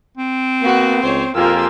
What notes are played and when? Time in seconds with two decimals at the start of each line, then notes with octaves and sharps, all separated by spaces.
0.17 C4
0.62 A#3 B3 F#4
1.03 C#2 C5 C#5
1.35 F2 A#3 F4 G4 G#4 A#4 E6